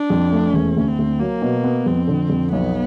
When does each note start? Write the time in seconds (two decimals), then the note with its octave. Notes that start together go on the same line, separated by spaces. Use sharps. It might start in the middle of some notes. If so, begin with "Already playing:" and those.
Already playing: D4
0.10 F2
0.32 A3
0.54 E1 C#4
0.77 D2
0.87 C4
0.98 D2
1.19 F#3 A#3
1.42 B2
1.64 B3
1.86 F2 C4
2.08 D3
2.30 F2
2.52 B1 B3